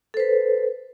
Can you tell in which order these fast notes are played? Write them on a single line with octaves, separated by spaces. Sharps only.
A4 C5 B4